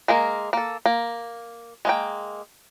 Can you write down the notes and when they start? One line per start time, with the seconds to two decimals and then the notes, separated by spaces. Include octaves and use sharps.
0.08 G#3 A#3 A#4
0.53 A#3 A4
0.86 A#3
1.85 G#3 A#3 G5